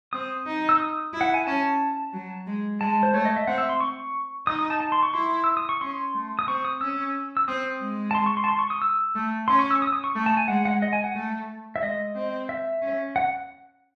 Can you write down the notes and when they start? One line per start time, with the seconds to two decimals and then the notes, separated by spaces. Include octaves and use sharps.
0.13 C4 D#6
0.46 D#4
0.69 E6
0.80 D#6
1.13 E4
1.21 F#5
1.34 G#5
1.47 C#4 A5
2.13 F#3
2.47 G#3
2.80 G#3 A5
3.03 C5
3.13 A3 C#5
3.25 D#5
3.36 E5
3.47 C4 F#5
3.58 E5
3.69 C6
3.81 C#6
4.47 D#4 D#6
4.59 D#6
4.70 A5
4.80 A5
4.92 C6
5.03 C#6
5.14 E4 C6
5.44 E6
5.57 D#6
5.69 C#6
5.81 C#4 C6
6.14 A3
6.39 D#6
6.48 C4 C#6
6.65 D#6
6.81 C#4 E6
7.37 E6
7.48 C4 D#6
7.81 G#3
8.11 A5
8.15 C6
8.26 C#6
8.37 C6
8.44 A5
8.48 C6
8.59 C#6
8.70 D#6
8.82 E6
9.15 A3
9.48 C#4 C6
9.59 C#6
9.71 E6
9.82 D#6
9.87 E6
9.93 D#6
10.04 C#6
10.15 A3
10.26 A5
10.37 G#5
10.48 G#3 F#5
10.65 F#5
10.82 D#5
10.93 G#5
11.04 F#5
11.15 A3
11.76 E5
11.82 G#3 D#5
12.15 C4
12.49 E5
12.82 C#4
13.16 F#5